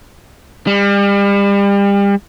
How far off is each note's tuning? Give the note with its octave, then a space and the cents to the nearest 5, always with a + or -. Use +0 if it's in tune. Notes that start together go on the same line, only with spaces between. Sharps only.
G3 +35